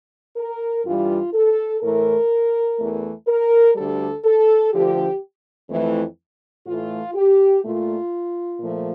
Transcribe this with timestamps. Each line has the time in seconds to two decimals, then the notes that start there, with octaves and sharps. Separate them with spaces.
0.36 A#4
0.85 G2 E3 G3 F4
1.33 A4
1.81 A2 E3 A3 A#4
2.78 E2 E3 A3
3.27 A#4
3.75 D2 D3 G3 A4
4.24 A4
4.72 D2 D3 F3 G4
5.69 F2 E3 A3
6.66 A2 E3 A3 F4
7.15 G4
7.63 A#2 A3 F4
8.60 A#2 F3 A3